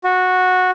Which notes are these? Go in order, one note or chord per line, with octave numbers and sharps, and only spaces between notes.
F#4